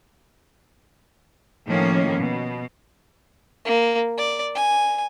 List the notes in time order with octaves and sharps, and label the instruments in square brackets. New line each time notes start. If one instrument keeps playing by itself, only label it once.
[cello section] A2 D#3 F3 A#3 C#4
B2
[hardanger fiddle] A#3
D5
G#5